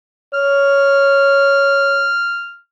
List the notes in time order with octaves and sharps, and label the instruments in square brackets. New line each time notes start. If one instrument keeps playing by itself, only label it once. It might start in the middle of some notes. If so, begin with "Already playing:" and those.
[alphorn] C#5 [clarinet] F6